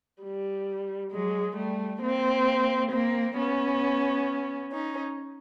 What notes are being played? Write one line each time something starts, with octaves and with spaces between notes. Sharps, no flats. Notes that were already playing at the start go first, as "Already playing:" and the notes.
G3
F#3 G#3
G3 A3
A#3 C4
A#3 C4
B3 C#4
C#4 D#4